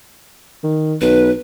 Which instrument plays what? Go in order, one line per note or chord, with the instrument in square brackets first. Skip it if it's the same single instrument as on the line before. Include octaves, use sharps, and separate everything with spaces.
[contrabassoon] D#3
[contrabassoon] B1 [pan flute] B4